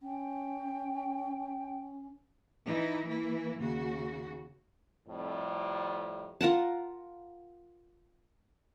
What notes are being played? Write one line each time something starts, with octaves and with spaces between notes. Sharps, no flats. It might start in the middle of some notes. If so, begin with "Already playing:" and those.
C#4 G5
E3 D#4 E4
E3 A#3 E4
D#2 C#3 F#4
F2 A2 C3 G3
F4 A#4 F#5 A5